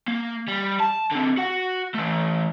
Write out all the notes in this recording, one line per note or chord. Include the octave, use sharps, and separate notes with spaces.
A#3
G3
A5
D3 C4
F#4 F#5
E3 A3